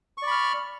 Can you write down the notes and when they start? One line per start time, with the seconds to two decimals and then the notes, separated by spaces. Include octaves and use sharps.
0.18 C#6
0.22 D5
0.27 B5
0.31 F6